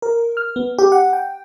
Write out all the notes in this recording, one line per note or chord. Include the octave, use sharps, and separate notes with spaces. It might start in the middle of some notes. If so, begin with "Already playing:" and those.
A#4
F6
B3
G4
F#5
G5